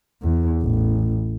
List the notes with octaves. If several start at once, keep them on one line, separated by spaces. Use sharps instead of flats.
E2
A1